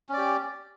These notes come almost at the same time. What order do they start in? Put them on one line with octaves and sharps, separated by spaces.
C#4 D5 G4